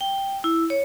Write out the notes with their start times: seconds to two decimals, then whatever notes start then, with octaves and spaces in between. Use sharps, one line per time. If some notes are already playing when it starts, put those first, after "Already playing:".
0.01 G5
0.44 E4
0.70 C#5